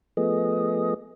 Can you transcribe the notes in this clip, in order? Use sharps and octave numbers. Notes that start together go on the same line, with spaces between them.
F3 A3 B3 G#4 D#5